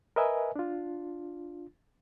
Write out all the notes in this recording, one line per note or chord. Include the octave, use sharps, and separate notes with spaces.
A#4 B4 D#5 E5 G#5
D4 F4